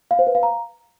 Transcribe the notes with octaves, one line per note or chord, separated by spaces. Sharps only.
F5
C5
B4
F5
A#5